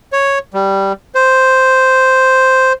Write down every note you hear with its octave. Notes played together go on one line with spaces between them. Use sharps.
C#5
G3
C5